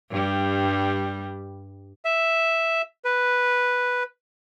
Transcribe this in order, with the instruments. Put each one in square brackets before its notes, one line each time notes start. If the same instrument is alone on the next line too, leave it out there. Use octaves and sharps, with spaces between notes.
[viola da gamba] G2 G3
[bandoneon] E5
B4